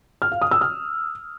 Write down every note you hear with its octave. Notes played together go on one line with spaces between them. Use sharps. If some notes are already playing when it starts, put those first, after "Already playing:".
F6
F5
D#6
E6
F6